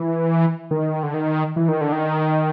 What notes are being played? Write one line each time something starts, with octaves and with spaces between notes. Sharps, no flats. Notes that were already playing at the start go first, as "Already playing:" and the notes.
Already playing: E3
D#3
D3
D#3
E3
D#3
D3
D#3